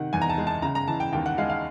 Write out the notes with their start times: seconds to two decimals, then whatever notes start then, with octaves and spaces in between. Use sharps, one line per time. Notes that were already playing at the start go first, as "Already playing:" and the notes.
Already playing: C3 D#3 F#5
0.13 E2 G#5
0.22 A#5
0.30 A5
0.38 G#3
0.47 A5
0.62 C#3 A#5
0.75 A#5
0.88 E3 A5
1.00 G5
1.12 D#2 G5
1.26 F#5
1.38 G#3 F5
1.50 F5